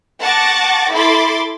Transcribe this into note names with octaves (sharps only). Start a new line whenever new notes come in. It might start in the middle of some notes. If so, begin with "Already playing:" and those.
F#5 A5 C#6 D6 A6 A#6
E4 A4 B5 C6 D6 A6